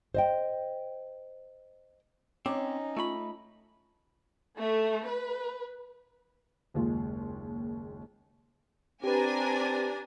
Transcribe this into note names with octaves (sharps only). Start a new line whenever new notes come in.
C5 D#5 G5
C4 C#4 D#4 D6
A3 F4 B5
A3
B4
F#1 D#2 G#3 F4
C4 D4 G4 B4 G#5 A#5